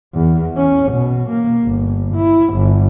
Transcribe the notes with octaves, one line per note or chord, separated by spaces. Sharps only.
E2
C#4
B2
A#3
G1
E4
G1